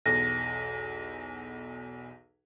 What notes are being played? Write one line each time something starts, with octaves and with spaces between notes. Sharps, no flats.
B1 E2 A#6